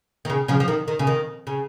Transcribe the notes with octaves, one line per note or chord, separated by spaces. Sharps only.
D#3
C#3
C#3 F3
F3
D#3
D#3
C#3
D#3
C#3